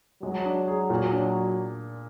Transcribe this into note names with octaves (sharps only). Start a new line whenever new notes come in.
F#3 G#3
D4
G#4
A#2
D4